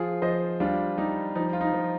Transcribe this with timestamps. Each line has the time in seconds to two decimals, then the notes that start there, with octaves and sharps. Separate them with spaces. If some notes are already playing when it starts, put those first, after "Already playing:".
Already playing: F3 F4 G#4
0.22 F3 C5 D#5
0.60 G3 D4 F4
0.97 G3 D#4
1.35 F3 D#4
1.53 F4
1.61 D#4
1.73 F3